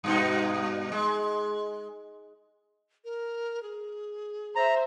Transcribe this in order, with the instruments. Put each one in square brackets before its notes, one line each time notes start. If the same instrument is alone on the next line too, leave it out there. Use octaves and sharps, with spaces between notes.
[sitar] G2 B2 D#4
G#3
[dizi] A#4
G#4
[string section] C5 E5 [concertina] A#5